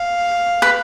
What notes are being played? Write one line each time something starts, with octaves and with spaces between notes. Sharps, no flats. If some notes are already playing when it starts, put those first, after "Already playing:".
Already playing: F5
B4